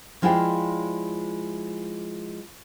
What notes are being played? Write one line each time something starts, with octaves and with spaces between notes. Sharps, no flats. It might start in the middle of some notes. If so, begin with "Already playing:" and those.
F3 G#3 E4 F4 D5 G5